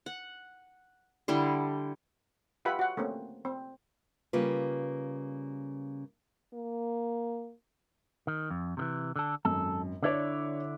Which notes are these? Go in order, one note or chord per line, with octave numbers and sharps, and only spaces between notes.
F#5
D3 G3 E4
F4 G4 B4 E5 F#5 B5
F#4 F#5
A3 A#3 C4 C#4
C4
C#3 G3 A#3 F4 B4
A#3
D#3
F2
C3 D#3 E3
D3 A4
G#1 F#2 A4
D3 D4 E4 C#5 D5